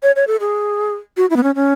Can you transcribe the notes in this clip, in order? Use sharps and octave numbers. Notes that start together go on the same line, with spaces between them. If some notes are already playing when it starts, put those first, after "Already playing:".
C#5
C#5
A4
G#4
F#4
E4
B3
C#4
C#4